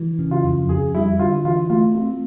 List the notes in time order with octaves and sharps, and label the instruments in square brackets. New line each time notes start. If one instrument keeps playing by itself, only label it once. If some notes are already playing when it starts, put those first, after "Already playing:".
Already playing: [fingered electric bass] E3
C#3
[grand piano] F4
[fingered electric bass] F2
[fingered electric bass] F2 [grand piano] G#4
[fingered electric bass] G3 [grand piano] E4
[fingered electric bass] D3 [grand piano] F4
[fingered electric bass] E3 [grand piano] F4
[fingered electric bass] A3 [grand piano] F4
[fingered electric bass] C4 [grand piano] F4